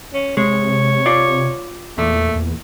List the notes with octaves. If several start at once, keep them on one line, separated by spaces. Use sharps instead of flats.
C#4
C3 G#3 C#5
F4 D5
E2 A#2 A3
E2